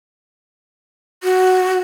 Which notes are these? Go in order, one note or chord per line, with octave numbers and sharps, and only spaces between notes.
F#4